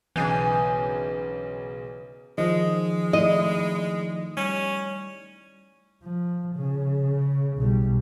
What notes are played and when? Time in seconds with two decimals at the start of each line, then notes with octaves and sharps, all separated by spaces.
0.16 B1 C#3 E3 D4 G#4 G#5 G6
2.38 D#3 F3 G#3 D#5
3.13 A3 D#4 E4 D#5
4.37 G3 C#4
6.03 F3
6.56 C#3
7.57 B1 G3